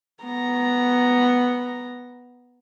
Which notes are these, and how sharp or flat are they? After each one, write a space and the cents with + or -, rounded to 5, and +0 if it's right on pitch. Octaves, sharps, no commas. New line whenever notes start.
B3 +0 A#5 +0